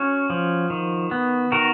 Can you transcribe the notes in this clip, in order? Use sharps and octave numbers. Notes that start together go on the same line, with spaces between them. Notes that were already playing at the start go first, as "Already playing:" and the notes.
Already playing: C#4 F#4
F3
D#3
B3
D#3 F#4 A#4